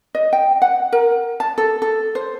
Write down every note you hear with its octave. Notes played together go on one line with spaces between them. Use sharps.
D#5
G5
F#5
A#4
A5
A4
A4
C5